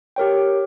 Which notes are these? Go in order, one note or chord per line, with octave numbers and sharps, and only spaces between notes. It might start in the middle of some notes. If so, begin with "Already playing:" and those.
G4 A#4 C#5 G5